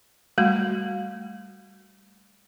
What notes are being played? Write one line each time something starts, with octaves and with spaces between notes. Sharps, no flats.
G3 A3 F#4